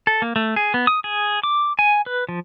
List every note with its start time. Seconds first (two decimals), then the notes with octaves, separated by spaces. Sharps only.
0.07 A4
0.22 A#3
0.36 A3
0.56 G#4
0.74 B3
0.87 D#6
1.04 G#4
1.43 D6
1.79 G#5
2.06 B4
2.29 F3